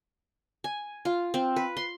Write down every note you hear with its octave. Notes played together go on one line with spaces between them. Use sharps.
G#5
F4
C4
B4
C6